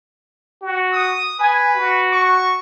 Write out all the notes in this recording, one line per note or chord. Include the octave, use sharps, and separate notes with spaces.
F#4
D#6
B4 G#5
F#4
C#6